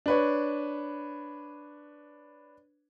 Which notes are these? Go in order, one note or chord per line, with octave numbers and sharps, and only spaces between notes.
D4 B4 C#5